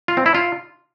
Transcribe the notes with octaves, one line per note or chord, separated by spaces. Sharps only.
F4
C4
E4
F4